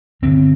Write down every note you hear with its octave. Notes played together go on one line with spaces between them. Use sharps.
G2 D3 C4